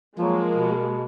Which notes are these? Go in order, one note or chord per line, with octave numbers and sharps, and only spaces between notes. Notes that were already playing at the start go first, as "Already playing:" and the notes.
F3 F#3 G#3 A#3
B2